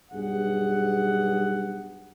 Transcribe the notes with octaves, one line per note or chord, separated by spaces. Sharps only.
B1 G2 G#4 F#5